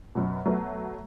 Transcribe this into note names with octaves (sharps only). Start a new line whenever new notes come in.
F#2 B2
F#3 A3 B3